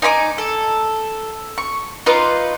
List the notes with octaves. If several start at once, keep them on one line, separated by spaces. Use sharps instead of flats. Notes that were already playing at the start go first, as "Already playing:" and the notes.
D#4 G#5 B5 D6
A4
C#6
D#4 F4 B4 D6